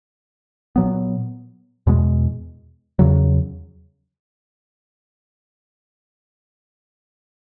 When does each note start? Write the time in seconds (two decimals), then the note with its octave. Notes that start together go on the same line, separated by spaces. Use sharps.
0.76 A#2 F#3 B3
1.87 E2 B2 G#3
2.99 E2 C#3 F#3